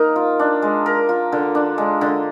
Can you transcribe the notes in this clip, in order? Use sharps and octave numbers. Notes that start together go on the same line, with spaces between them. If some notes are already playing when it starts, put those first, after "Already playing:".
Already playing: A#3 D#4 A#4
F4
D4
G#3
A#4
F4
D3
D4
G#3
D3